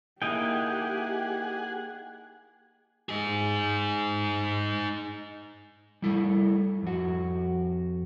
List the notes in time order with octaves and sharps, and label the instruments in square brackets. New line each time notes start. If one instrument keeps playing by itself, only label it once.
[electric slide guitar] A#3 D#4 E4 [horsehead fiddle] G4 [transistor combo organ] G#4 F#5 [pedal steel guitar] D#5 G5
[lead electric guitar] D#4 G#4
[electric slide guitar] G3 E4 A4
F2 F#4